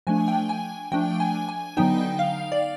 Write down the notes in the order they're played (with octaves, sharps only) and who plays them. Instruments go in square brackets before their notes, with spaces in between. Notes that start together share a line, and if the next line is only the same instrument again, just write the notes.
[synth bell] F3 A3 D4 G#5
G5
G#5
F3 A3 D4 G5
G#5
G#5
D3 F#3 B3 D#4 G5
F5
D5